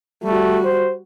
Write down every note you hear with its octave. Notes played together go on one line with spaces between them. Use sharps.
G3 A3 F#4
C5